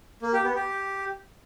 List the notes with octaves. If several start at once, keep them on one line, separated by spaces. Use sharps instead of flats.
A#3
G4
B3
G4